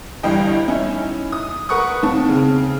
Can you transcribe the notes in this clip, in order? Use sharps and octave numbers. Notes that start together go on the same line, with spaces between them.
G1 G2 E3 G3 D#5 G5
C#4 D#4 E4
D#6
A#4 B4 F#5 C#6 D#6
D#2 D#3 C4 A5
C#3 C4